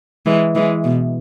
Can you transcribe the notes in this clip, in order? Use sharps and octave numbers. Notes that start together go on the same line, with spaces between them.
E3 G#3
E3 G#3
B2